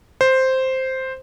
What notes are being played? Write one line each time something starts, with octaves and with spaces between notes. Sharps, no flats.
C5